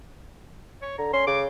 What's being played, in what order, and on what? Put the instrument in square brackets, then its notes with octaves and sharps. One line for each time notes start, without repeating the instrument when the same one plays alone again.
[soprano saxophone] C#5
[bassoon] D3 [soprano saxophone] A#5
[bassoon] C#4 [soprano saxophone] C6
[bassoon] C#3 [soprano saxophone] D6